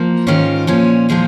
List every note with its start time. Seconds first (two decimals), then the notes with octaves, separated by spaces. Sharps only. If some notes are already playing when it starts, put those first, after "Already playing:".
Already playing: F3 A#3
0.27 G#2 D#3 C#4 F4
0.67 A#2 F3 C#4
1.09 A#2 F3 G#3 D#4